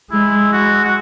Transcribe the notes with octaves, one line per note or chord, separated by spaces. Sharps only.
G#3 E4
F#4
F#4